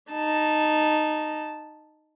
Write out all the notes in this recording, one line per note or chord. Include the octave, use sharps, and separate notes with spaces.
D#4 A5